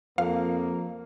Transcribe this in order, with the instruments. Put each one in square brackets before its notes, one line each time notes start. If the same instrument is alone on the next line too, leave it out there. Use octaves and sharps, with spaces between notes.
[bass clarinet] F2 [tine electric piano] F3 [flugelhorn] A#3 [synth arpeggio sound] F5